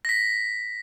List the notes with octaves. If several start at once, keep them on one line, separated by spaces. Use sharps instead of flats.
A#6 B6